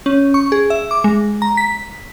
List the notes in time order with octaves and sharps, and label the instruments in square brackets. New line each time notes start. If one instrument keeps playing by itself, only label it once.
[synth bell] C#4
C#6
G#4
E5
D6
G#3
A#5
B6